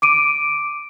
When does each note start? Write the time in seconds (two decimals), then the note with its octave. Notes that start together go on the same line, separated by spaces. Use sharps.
0.02 D6 D7 D#7